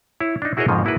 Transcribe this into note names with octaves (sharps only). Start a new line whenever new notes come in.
E4 C#5
D4 D#4
E4 F#4 G#4 A#4 C#5 D#5
F2 G#2 C#3 F3
A#3 E4 F#4 G#4 B4